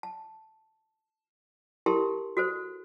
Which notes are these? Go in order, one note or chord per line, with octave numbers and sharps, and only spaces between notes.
A5
E4 G4 A4 A#4 A5 C6
F#4 A4 C5